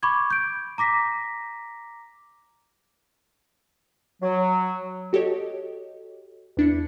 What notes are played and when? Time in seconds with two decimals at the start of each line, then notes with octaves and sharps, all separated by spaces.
0.03 B5 C#6 D6 G#6
0.30 G6 D7
0.78 A#5 D6 A#6 B6
4.22 F#3
5.13 F#4 G4 A4 C#5 D#5
6.57 E2 D4 E4 C#7